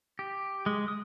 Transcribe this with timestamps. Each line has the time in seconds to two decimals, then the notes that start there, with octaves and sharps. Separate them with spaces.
0.19 G4
0.66 G#3
0.88 D#6